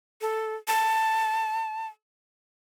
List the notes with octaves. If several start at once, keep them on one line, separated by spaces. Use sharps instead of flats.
A4
A5